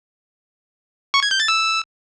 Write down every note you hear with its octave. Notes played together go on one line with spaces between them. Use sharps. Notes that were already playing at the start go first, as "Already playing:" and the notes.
C#6
G#6
G6
A6
E6